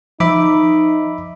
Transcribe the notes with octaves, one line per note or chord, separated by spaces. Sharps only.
F3 D#4 E5 B5 D6